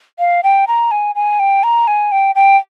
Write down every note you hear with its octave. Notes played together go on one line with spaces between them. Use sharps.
F5
G5
A#5
G#5
G#5
G5
A#5
G#5
G5
G5